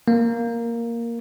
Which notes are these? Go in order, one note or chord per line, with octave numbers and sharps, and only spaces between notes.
A#3